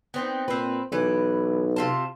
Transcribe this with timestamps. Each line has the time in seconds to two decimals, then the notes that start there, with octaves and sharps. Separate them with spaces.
0.14 B3 C4 D#4
0.48 A#2 C4 B4
0.92 B1 E3 B4
1.76 C3 F4 A5